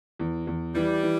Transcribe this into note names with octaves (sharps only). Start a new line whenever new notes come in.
E2
E2
E3 G3
E3